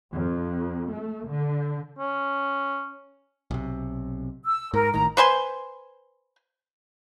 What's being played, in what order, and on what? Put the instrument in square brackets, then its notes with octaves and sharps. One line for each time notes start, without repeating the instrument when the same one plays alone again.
[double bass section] F2
A3
D3
[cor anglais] C#4
[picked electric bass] B1 C3
[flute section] E6
[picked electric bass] G#2 [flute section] A#4
[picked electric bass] G#1 A2 D#3 [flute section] A#5
[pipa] B4 C5 G#5 C6